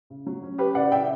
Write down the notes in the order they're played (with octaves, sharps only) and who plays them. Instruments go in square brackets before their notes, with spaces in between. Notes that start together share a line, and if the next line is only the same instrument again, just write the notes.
[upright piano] C#3
F#3
C#4
C#4 G4 B4
C#3 D5 F#5
C#3 E5 G5